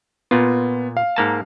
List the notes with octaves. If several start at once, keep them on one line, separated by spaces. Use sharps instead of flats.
A#2 B3 F4
F5
G#2 A#3 A5